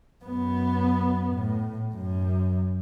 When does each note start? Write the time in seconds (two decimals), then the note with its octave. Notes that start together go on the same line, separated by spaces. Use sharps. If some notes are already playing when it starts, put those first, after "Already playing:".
0.24 F#2 B3
1.34 A2
1.94 F#2